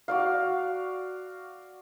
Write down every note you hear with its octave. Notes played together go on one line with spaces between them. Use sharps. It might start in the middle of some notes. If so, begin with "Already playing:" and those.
F#4 D5 F5